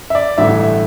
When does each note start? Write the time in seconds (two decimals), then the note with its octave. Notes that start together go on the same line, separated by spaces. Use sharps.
0.10 E5
0.15 D5
0.38 A1 G2 D3 A3 E5
0.60 E5